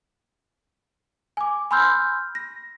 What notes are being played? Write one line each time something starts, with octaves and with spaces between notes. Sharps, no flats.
G#5 D6
G#5 B5 C6 E6 F6 G6
A#6